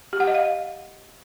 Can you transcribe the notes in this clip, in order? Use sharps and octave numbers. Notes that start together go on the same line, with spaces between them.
G4
F#5
D#5
F5